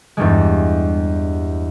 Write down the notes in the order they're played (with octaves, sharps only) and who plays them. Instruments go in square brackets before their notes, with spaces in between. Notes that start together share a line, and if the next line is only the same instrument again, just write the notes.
[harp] E2 G2 G3 G#3